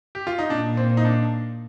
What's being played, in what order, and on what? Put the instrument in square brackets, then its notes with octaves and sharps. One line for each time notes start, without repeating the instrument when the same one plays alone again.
[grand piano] G4
F4
D#4
[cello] A#2 [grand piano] D4
[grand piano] C4
D#4
D4